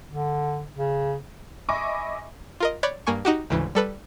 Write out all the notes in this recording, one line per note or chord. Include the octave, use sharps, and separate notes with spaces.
D3
C#3
D#5 E5 G#5 B5 C#6 D6
F4 A#4 D#5
C#5 D5 B5 F#6 G6
G2 A#3 G#5 C#6
D#4 F#4 G4
D2 G#2 C#3 E3
G3 A4 B4